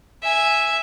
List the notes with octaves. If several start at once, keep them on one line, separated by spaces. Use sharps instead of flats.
E5 G#5